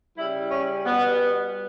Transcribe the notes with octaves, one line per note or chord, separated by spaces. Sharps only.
C#3 G3 E4
C#4
B2 G3 B3